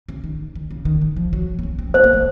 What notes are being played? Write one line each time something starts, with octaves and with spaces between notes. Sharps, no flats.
C#3
D#3
D#3
C#3
D#3
D#3
F3
F#3
C4
C#4
C4
C4 C5
A#3
G#3